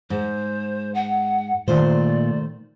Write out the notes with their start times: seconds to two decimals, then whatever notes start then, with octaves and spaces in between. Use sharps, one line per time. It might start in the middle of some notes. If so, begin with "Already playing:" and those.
0.10 G#2 C5
0.94 F#5
1.68 A#2 D#3 A3 C5 D5